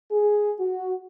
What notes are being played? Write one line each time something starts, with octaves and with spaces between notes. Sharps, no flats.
G#4
F#4